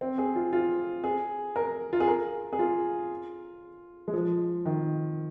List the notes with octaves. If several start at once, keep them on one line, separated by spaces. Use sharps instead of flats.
C4
G#4
F4
F4
G#4
A#4
F4
G#4
A#4
G#4
F4
G#3
F3
D#3